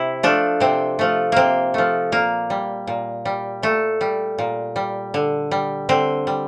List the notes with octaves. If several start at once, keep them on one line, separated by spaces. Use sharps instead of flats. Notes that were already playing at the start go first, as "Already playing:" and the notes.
Already playing: C3 E4
F3 A3 D4
C3 C4
F3 A3
C3 A#3 C4
F3 A3
A#2 A#3
G3
A#2
G3
A#2 A3
G3
A#2
G3
D3
G3
D3 C4
G3